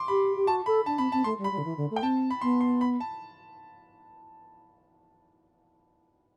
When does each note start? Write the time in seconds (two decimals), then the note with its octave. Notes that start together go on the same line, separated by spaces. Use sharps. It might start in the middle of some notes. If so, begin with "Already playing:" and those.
Already playing: C6 D6
0.08 G4 B5
0.36 G4
0.47 F#4 A5
0.66 A4 B5
0.86 D4 A5
0.98 C4 B5
1.12 C4 A5
1.24 A3 C6
1.38 G3
1.44 B5
1.51 G3
1.58 D3
1.64 E3
1.77 D3
1.90 A3
1.96 G5
2.02 C4 A5
2.30 B5
2.41 B3 C6
2.61 C6
2.81 B5
3.00 A5